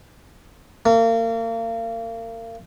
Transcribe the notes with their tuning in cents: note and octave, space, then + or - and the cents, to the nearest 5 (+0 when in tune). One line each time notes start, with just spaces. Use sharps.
A#3 -35